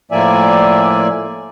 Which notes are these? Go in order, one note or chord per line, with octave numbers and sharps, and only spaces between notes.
A2 F3 A#3 D5 E5 G#5